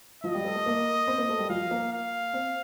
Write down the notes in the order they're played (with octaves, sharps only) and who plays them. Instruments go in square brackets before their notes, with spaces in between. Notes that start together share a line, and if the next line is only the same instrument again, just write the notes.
[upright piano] F3 F4 [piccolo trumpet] D#5
[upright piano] G3 G4
A3 A4
A3 A4
A#3 A#4
C4 C5
A#3 A#4
A3 A4
G3 G4
[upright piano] F3 F4 [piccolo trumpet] F5
[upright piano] A#3 A#4
[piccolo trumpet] F5
[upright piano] C4 C5